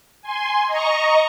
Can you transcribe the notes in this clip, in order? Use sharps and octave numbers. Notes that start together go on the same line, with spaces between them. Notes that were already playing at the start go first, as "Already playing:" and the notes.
G#5 C6
D#5 A#5 C#6